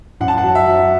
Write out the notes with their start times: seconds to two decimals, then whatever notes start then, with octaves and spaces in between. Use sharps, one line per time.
0.20 F#2 F#5
0.28 A5
0.38 F#5
0.43 F#3
0.55 E5
0.66 F#3